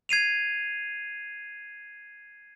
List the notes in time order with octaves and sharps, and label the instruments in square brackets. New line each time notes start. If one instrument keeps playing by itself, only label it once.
[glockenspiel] G#6 C7 D#7 F7